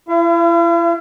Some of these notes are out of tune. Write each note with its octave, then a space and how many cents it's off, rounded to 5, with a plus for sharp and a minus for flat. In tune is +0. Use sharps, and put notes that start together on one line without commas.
E4 +35 F5 -45